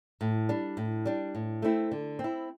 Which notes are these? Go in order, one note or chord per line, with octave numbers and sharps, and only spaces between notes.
A2
G3 D4
A2
G3 D4
A2
A3 C4 E4
D3
C4
E4